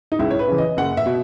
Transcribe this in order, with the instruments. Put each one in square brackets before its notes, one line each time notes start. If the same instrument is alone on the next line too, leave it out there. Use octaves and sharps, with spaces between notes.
[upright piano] D#4
C#2 E4
C#5
B4
C#3 E3
D#5
F#1 F#5
E5
B2